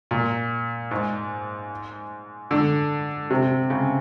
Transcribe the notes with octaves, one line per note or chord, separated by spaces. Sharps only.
A#2
G#2
D3
C3
C#3